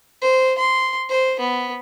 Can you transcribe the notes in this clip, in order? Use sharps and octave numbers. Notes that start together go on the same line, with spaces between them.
C5
C6
C5
B3